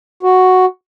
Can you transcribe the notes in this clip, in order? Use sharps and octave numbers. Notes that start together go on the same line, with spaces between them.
F#4